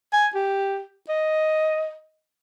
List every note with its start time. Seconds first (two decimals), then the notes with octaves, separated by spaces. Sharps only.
0.13 G#5
0.35 G4
1.09 D#5